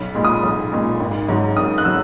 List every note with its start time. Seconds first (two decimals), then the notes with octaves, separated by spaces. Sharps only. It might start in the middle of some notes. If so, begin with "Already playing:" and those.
Already playing: B1 B5
0.15 A#2 G#3
0.24 D#6
0.43 B1
0.72 A#2 G#3
1.00 G#1
1.28 G#2 F#3
1.56 G#1 D#6
1.78 F#6
1.85 F#3 E6